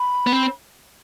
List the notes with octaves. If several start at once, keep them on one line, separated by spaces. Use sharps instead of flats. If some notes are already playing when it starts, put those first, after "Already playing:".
Already playing: B5
B3
C4